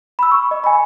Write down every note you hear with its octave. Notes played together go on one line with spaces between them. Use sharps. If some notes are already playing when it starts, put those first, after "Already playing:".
B5 E6
C#6
D#5
G#5 B5